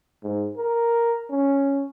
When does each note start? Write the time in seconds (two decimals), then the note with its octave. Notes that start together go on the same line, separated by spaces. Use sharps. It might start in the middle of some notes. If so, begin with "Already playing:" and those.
0.23 G#2
0.57 A#4
1.30 C#4